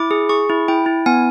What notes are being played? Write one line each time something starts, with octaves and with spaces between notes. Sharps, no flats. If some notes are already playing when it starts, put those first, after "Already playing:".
Already playing: E4 D6
G#4
G#4 C#6
E4
E4 G5
E4
B3 G#5